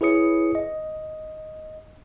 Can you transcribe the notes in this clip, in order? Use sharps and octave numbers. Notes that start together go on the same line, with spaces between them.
E4 G#4 B4 C#5 D#6 C#7
D#5